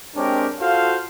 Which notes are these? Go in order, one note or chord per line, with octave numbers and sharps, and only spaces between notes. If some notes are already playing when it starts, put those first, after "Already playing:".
G#3 C4 D4 G4 A#4 C#5
F4 F#4 A4 C5 F5